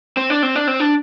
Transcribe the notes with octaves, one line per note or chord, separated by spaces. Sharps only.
C4
D4
C4
D4
C4
D4